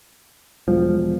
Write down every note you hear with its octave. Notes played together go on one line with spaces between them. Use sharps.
E1 F3